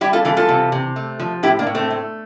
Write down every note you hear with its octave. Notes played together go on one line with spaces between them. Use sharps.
G3 E4 G4
F4 A4
E3 F4 A4
F4 A4
C3
C3
A3
F3
A2 E4 G4
A#3 D4
A2
A3 C4
A3